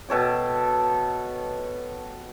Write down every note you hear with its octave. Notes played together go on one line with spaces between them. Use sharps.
B2 A4 C#5 G5